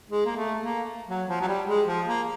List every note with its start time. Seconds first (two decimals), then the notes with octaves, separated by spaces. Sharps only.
0.10 G#3
0.26 A#3
0.36 A3
0.62 A#3
1.08 F#3
1.28 F3
1.41 F#3
1.48 G3
1.68 G#3
1.87 F3
2.07 A#3